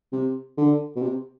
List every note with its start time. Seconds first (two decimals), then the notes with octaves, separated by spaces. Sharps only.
0.13 C3
0.57 D3
0.96 B2
1.02 C3